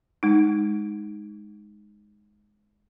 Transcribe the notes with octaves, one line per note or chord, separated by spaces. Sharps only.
G#3 D#4